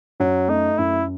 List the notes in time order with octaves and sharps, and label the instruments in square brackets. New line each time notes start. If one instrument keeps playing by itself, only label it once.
[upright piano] F#2 [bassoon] F#3
[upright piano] A3 [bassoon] D#4
[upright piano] F#2 [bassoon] E4